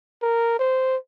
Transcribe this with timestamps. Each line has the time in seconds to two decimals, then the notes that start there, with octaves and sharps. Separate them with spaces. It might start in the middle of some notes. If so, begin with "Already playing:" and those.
0.23 A#4
0.59 C5